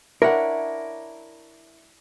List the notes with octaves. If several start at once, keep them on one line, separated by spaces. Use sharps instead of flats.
D4 E4 A#4 C#5 F#5